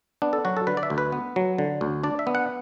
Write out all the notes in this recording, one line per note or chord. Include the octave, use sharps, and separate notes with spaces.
B3 D4
A4
F#3 F#4
A4
D3 B4
D5
E5
D2
B4
B3
F#3
D3
D2
D4 D5
E5
B3
F#5